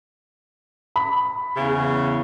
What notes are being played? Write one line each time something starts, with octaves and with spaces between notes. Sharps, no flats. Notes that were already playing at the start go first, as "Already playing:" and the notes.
B5
E2 C#3